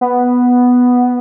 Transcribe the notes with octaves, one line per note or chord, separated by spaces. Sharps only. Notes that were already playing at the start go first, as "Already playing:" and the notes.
B3